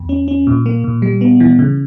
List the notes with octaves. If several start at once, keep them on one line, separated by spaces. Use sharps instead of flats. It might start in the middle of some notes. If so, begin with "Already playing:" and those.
Already playing: E2
C#4
C#4
A#2
A#3
A#2
G3
B3
E3
C#3